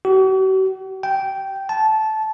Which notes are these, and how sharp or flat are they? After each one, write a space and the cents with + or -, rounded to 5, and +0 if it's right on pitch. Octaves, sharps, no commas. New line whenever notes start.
F#4 +45
G5 -10
A5 -15